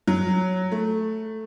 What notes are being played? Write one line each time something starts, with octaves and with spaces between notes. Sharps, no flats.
F#3
A3